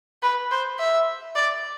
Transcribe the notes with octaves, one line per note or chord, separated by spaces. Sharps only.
B4
C5
E5
D5